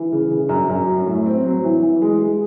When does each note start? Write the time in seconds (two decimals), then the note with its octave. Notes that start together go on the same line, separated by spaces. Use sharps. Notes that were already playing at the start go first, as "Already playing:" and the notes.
Already playing: E3
0.12 C#3
0.31 C#3
0.49 F#2
0.69 F#2
0.87 F#3
1.06 A2
1.26 C4
1.44 F#3
1.64 E3
1.82 E3
2.02 G#3
2.20 G#3